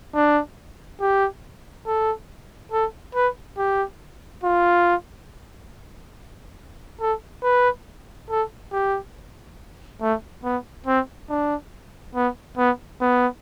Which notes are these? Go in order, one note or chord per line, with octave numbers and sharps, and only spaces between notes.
D4
G4
A4
A4
B4
G4
F4
A4
B4
A4
G4
A3
B3
C4
D4
B3
B3
B3